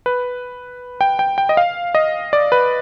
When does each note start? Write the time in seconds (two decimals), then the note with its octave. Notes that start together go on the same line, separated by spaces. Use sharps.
0.06 B4
1.01 G5
1.19 G5
1.38 G5
1.49 D#5
1.57 F5
1.95 D#5
2.33 D5
2.52 B4